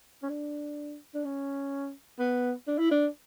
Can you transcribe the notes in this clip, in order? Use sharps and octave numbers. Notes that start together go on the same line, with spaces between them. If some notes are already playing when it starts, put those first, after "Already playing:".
C#4
D4
D4
C#4
B3
D4
E4
D4